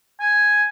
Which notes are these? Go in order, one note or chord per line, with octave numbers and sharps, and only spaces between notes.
G#5